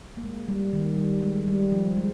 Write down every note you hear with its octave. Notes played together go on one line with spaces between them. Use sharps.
A#3
G#3
G3
D#3
G3
G#3
G3
F3
G#3